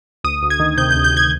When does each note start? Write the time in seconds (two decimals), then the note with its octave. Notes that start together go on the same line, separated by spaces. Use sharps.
0.24 D2 D#6
0.42 D2
0.50 G#6
0.60 D#3
0.78 C3 G6
0.91 G6
0.95 D2
1.04 G6
1.13 D2 G#6